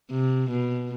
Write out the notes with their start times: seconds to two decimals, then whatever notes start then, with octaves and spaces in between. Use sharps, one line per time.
0.12 C3
0.51 B2